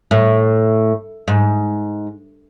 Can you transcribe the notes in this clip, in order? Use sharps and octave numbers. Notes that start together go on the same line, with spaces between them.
A2
G#2